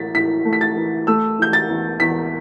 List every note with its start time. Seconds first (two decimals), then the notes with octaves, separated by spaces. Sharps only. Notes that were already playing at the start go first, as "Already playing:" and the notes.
Already playing: A2 E3 A6 B6
0.14 A2 B6
0.45 A3
0.53 B6
0.61 A6
0.76 E3
1.07 A3 E6
1.38 E3 G6
1.53 A6
1.69 E2
2.00 E2 B6